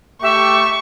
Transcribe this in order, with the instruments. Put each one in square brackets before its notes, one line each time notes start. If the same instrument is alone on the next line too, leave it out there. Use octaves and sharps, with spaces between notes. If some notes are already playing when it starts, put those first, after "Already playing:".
[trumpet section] A3 G4 [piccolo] E5 [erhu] C#6